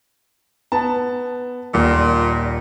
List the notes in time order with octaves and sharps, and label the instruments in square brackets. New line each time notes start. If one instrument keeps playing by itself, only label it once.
[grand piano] B3 A5
[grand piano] D#1 [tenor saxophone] A#2